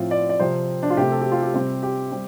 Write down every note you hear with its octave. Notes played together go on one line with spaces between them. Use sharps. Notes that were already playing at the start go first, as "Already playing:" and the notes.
Already playing: A2 F3 C4 F4
D5
D5
C3 F3 C4 C5
D4
F4
C3 A3 C4 G4
A4
G4
F4
G4
C3 G3 C4
G4
G3 C4